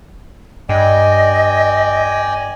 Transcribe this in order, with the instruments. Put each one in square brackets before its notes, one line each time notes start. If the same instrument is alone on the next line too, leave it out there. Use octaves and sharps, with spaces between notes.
[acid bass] G2 [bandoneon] D5 G5 G#5 [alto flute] D#5